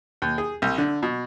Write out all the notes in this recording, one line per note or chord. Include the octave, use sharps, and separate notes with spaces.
D#2
G#4
C2
D3
B2